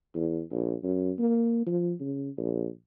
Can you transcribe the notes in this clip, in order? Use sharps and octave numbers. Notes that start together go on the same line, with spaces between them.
E2
A#1
F#2
A#3
F3
C#3
A#1